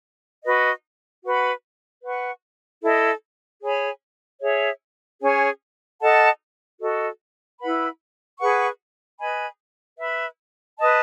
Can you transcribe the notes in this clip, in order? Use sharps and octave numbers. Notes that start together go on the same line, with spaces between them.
F#4 B4 D#5
F#4 B4 F#5 B5
B4 F#5 C#6
E4 A4 D#5
G#4 C#5 G#5 B5
G#4 C#5 E5
C#4 G#4 C#5 G#5
A4 D#5 F#5 A5
F#4 A4 D#5
E4 B4 F#5 B5
G#4 B4 F#5 C#6
B4 D#5 G#5 B5
B4 E5 B5
B4 D#5 A5